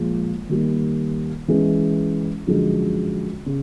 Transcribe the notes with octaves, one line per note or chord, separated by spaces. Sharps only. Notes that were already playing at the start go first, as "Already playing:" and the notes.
Already playing: A#2 F3 G#3
D#3 G3 A#3
E3 G#3 C#4
F#2 D3 F3 G#3
C#3